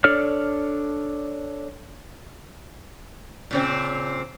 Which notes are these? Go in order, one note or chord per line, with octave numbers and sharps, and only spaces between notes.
D4 A4 C#5 D5 F6
A#2 C#3 C4